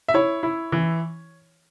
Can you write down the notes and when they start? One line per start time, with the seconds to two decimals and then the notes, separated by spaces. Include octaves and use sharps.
0.08 E5
0.14 E4 C#5
0.43 E4
0.72 E3